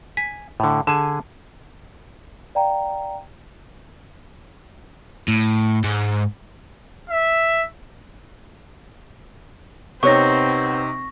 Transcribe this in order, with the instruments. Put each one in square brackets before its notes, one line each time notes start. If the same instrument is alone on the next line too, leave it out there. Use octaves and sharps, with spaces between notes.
[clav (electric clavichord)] G#5 [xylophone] B6
[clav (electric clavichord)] A2 D3
[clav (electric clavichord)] D3 G#4 G#5 [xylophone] A5
[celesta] D5 F5 G5 A#5
[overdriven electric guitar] A2
G#2
[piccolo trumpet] E5
[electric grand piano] C3 D#4 [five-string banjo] B3 C#5 [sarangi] C4 [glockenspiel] C#6 A#6